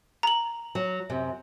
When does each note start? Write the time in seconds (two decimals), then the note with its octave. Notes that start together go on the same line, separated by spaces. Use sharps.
0.23 A#5 F#7
0.75 F#3
1.10 F#2 C3